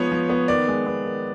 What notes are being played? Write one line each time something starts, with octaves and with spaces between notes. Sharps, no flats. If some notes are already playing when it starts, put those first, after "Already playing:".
Already playing: F3 G#3 B3 C#5
F3
B3
D#3 D5
G#3
B3
D#3